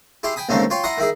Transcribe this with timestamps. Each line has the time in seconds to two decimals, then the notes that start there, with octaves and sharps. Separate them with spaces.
0.23 E4 G4 G#4 C6
0.36 G5 G#5 B5 D#6
0.49 D#2 G#2 C#3 A3 C4 C#4
0.70 F4 C#5 G5 C6
0.83 E4 F#5 A#5 C6 D#6
0.98 D#3 E4 G#4